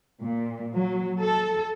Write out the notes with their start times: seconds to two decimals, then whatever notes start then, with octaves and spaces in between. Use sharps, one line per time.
0.20 A#2
0.74 F#3
1.20 A4